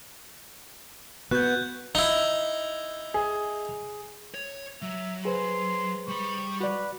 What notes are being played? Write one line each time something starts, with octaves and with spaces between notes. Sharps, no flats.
B3 F#4 F#6 G6
D#4 E4 G7
G#4
C#5
F#3 E5
G#4 B4 C5 C6
G3 B5 C#6
F#4 B4 D5